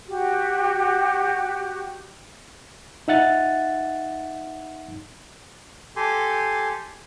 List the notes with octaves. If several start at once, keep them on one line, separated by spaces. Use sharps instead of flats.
F#4 G4
D#4 E5 F#5 A6
G4 A4 G#5 C6